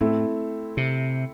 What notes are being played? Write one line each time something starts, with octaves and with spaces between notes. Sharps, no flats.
A2 A3 C4 E4
C3